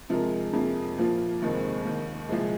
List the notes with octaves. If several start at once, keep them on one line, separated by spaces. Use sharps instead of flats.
C3 F3 G#3 F4 A#4
F2 C3 F3 A#3 G#4
A#2 F3 A#3 F4
F1 D#2 D#3 G#3 C4
D#2 D#3 A#3
C2 A#2 F3 G#3